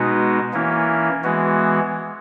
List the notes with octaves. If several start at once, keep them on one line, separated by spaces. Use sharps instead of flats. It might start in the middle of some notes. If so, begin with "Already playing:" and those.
Already playing: B2 G#3 B3 D#4 F#4
E3 A#3 C#4 E4
E3 G#3 B3 F#4